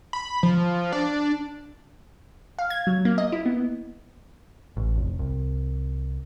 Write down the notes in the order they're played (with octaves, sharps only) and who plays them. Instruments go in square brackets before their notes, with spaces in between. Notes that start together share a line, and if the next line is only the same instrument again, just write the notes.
[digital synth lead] B5
F3
D4
[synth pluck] F5
G#6
F#3
A#3
D#5
E4
B3
[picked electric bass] A1
F1
C2